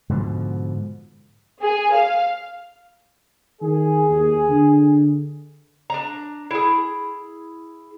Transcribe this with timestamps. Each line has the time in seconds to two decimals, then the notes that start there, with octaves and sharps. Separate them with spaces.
0.09 G#2 B2 D3 F3
1.62 G#4
1.95 F5
3.62 D#3 G#4
4.10 D#2
4.49 D3
5.90 D4 A#5
6.51 E4 G#4